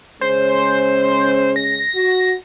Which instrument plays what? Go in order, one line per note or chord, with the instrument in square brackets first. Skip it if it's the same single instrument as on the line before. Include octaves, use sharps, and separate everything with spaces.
[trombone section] C#3 G#3 C#4 [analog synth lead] C5
[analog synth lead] A#6
[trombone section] F#4